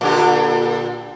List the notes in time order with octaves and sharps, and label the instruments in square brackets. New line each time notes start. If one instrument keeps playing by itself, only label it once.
[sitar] A#2 D3 G4